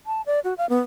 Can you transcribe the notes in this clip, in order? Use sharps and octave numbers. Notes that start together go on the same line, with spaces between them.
A5
D5
F#4
F5
B3